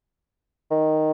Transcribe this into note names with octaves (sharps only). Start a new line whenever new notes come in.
D#3